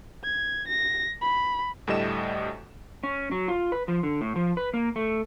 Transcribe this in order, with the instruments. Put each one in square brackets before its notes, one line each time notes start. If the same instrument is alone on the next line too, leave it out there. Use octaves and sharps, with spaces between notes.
[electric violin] G#6
A#6
B5
[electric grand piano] D2 A2 G3 A3 D#5 E7
[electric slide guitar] C#4
F#3
F4
B4
F3
D3
A2
F3
B4
A#3
A3